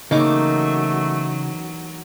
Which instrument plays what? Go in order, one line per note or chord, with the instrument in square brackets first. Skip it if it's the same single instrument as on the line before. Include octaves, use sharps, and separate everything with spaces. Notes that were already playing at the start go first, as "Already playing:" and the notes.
[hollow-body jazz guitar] C#3 [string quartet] E3 F#3 [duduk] A3 [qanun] A#3 D#4 D6